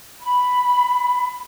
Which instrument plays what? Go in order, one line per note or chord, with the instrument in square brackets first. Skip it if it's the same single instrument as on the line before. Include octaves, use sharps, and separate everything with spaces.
[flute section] B5